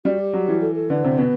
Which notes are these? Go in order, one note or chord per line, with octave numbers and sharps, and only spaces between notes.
G3 F#4
G4
F#3
E3
A4
A4
D3 B4
C3 C5
B2 B4